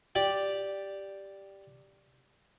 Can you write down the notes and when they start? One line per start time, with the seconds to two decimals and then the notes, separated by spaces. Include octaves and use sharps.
0.15 G4 D5 G5